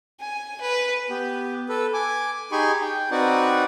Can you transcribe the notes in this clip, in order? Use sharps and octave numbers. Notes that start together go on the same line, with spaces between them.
G#5
B4
B3 G4
A4 B4
G#5 D6
D#4 G4 G#4 G#5 B5 C#6
G5
C4 D#4 F#4 B4 D5 F#5